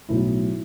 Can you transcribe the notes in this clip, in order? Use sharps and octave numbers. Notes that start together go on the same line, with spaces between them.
B1 A2 F#3 E4